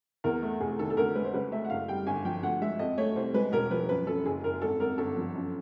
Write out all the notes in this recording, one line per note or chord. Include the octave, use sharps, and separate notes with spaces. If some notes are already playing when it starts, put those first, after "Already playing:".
E2 A#4
A3
F1 G#4
D#3 A4
A4
D2 A#4
G#3 B4
C5
C#2 B4
A3 E5
F#5
F#1 F5
G3 G5
G1 G#5
F3 G5
D2 F#5
G#3 E5
F2 D#5
A3 C#5
C2 C5
G#3 B4
E1 A#4
F3 B4
F#2 B4
F#2 A4
F#1 G#4
F#1 A#4
G#1 A4
G#1 A#4
G1 A4
F3
F#2